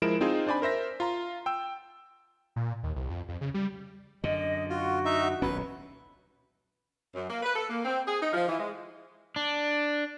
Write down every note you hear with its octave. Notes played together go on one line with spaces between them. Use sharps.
F3 G#3 E4 A#4 D7 E7
C4 D#4 F4 G#4
D4 C5 D5 G#5 B5
A#4 C5 E5 A#6
F4 A#5 C6
G5 E6
A#2
D#2
C2
F2
F2
C#3
G3
F#2 D3 D#5
F4 F#4
D#4 E5
D#1 B1 C#4 B4
F#2
A#3
B4
A4
A#3
C4
G#4
D#4
F3
E3
G#3
D4